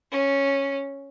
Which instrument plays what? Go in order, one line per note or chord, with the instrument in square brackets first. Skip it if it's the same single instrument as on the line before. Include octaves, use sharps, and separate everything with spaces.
[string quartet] C#4